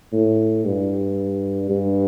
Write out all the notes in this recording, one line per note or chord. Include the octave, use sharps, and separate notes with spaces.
A2
G2
G2